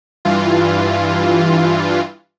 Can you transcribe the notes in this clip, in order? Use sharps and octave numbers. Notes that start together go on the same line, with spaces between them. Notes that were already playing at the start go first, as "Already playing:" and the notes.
G2 E3 F4